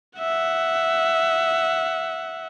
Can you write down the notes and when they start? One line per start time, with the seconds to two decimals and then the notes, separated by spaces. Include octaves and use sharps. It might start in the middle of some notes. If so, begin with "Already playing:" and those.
0.19 E5 F#5